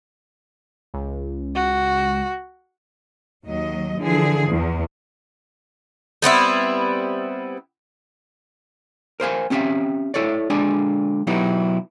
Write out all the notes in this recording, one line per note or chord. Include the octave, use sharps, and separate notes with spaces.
C#2
F#4
D#2 F#3 D#5
D3 E3 F3 G#4
E2
G3 B3 C4 E4
A#4 C5 F5 G#5
C4 C#4 G4 E5 F5
E4 A4 C#5 D5
D3 G#3 D4 D5 G#5
B2 F#3 B3 D#4 E4 G4